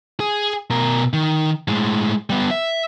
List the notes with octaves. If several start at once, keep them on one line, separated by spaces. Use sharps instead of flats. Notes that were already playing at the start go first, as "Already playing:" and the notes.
G#4
B2 A#4
D#3
A2 G#3
G3 B3
E5